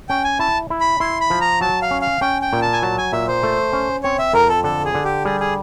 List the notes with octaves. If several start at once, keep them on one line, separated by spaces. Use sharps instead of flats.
C#4 G5
G#5
E4 A5
E4
B5
E4 C6
B5
F3
A#5
F#3 A5
F5
C#4
F5
C#4 G5
G5
A#2
A5
G#5
F#3 A5
G#5
A#2 E5
C5
A3
C#4
C4 C#5
E5
F2 A#4
A4
D3 A4
G#4
D3
G4
G3 G#4
G#4